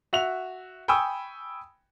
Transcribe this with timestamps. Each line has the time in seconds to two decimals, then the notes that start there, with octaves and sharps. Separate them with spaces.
0.13 F#4 E5 F7
0.88 G5 G#5 B5 C#6 D#6 E6